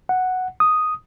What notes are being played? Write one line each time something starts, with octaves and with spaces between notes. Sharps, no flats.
F#5
D#6